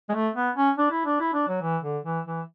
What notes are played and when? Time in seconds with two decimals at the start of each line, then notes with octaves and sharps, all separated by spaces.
0.09 G#3
0.14 A3
0.35 B3
0.56 C#4
0.78 D4
0.91 E4
1.05 D4
1.20 E4
1.34 D4
1.48 F#3
1.62 E3
1.83 D3
2.05 E3
2.26 E3